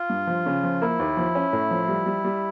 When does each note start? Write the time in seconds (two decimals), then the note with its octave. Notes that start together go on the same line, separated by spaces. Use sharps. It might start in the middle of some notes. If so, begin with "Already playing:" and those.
Already playing: F4
0.10 G2
0.27 F3
0.46 C#3
0.63 F3
0.81 A#3 E4
0.99 D#2
1.17 F3
1.35 C#4
1.53 A2
1.71 F3
1.88 G3
2.06 G3
2.24 G3